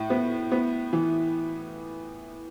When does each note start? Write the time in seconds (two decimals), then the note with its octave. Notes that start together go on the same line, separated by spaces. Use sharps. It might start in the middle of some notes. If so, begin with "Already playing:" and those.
Already playing: A2
0.10 B3
0.51 B3
0.93 E3